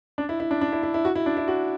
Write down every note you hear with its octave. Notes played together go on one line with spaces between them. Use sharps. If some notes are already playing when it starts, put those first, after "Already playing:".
D4
E4
E4
D4
D4
E4
E4
E4
F#4
E4
D4
E4
F#4